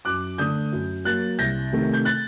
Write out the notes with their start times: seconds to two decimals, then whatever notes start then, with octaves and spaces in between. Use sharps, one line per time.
0.05 F#2 D6 F#6
0.38 D3 A3 D#6 G6
0.72 F#2
1.05 F#3 A#3 F#6 A6
1.39 C2 G6 A#6
1.72 C3 D#3 A3
1.94 G6
2.05 F#6 A6